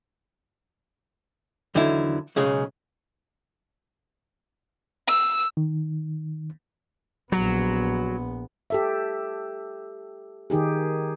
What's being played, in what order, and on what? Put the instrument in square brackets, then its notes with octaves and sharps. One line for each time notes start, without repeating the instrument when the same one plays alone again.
[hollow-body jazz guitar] E2 D3 D#3 F#3 E4
B1 C#3 G#3 G#4
[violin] E6
[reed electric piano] D#3
[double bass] A#1 B3 [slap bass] F#3
[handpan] G4 A4 E5
D#3 D#4 G4 G#4